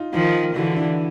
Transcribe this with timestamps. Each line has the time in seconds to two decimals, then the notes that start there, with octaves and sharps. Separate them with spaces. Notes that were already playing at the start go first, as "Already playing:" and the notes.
Already playing: D#4 F4
0.13 D#3 F3 D#4 F4
0.55 D3 E3 E4 F#4
0.76 D4 E4